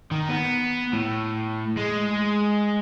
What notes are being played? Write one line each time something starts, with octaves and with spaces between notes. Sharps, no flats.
D#3
B3
A2
G#3